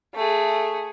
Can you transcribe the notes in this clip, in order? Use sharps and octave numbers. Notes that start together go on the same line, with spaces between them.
A3 G#4